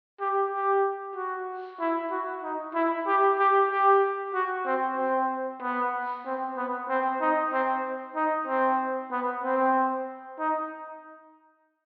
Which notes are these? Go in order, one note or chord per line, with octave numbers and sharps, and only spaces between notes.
G4
G4
F#4
E4
F#4
D#4
E4
G4
G4
G4
F#4
C4
C4
B3
C4
B3
C4
D#4
C4
D#4
C4
B3
C4
D#4